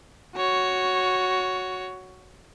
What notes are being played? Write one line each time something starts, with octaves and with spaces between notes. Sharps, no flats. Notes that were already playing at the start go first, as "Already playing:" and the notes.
F#4 C#5